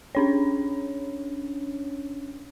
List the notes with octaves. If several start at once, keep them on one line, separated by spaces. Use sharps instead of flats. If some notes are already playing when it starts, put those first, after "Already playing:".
C#4 D4 C#5